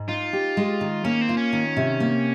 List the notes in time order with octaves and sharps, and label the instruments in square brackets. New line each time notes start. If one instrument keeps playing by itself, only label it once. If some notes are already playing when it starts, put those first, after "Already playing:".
Already playing: [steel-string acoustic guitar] G#2
[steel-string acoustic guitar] D#4 [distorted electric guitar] F4
[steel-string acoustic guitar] G4
G#3
D#3
[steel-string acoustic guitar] A#3 [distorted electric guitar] C#4
[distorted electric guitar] C4
[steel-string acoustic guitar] F4
[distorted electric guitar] C#4
[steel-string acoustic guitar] D#3
C3
A#3